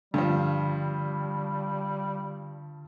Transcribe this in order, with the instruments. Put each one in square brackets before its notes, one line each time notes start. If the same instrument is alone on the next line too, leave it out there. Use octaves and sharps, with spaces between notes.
[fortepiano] G2 F3 [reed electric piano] D3 [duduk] G3